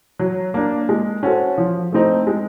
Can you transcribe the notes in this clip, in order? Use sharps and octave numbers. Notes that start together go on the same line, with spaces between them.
F#3
A#3 D4
G#3
C#4 F#4 A4 C5
F3
A3 C4 D#4
G#3